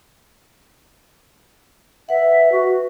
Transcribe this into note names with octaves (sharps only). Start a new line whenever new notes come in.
B4 E5 F#5
F#4